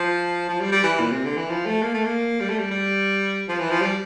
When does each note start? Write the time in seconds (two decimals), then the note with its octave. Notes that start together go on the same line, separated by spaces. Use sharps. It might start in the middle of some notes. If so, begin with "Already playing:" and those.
Already playing: F3
0.49 F3
0.61 G3
0.72 G3
0.83 E3
1.00 A#2
1.12 C3
1.25 D3
1.37 E3
1.50 F3
1.66 A3
1.83 A#3
1.94 A3
2.05 A#3
2.40 G3
2.49 A3
2.59 G3
2.71 G3
3.48 F3
3.59 E3
3.71 F3
3.81 G3